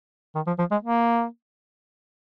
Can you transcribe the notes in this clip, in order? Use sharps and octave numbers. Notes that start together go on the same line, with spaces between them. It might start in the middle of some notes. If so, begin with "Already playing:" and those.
D#3
F3
F3
G#3
A#3